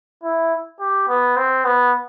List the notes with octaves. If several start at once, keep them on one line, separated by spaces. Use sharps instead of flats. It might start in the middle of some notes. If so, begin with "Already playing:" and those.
E4
G4
B3
C4
B3